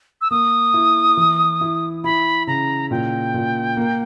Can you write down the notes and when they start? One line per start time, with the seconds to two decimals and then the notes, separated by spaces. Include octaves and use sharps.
0.21 E6
0.31 A#3 D#6
0.74 E4
1.17 E3
1.61 E4
2.04 E4 B5
2.47 C#3 A#5
2.91 A#2 G5
3.34 A#2
3.77 A#3